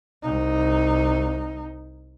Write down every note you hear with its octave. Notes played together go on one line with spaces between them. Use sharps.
C2 D#4